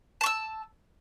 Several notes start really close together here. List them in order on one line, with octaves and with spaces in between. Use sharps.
A5 C#6 E6